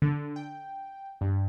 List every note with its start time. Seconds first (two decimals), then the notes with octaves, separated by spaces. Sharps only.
0.02 D3
0.36 G5
1.21 G2